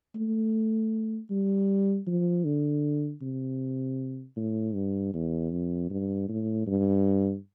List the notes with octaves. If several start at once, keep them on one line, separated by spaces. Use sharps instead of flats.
A3
G3
F3
D3
C3
A2
G2
E2
F2
G2
A2
G2